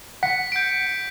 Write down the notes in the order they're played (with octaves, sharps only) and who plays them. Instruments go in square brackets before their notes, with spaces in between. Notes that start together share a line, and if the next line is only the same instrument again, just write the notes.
[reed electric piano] F#5 [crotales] B6 C#7
[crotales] G6 D7